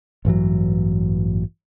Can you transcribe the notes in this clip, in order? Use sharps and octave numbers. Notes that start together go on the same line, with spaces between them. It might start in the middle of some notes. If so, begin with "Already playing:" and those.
A1 G2 E3 F#3